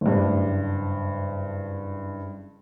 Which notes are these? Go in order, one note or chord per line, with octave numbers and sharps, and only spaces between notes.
F#1 G2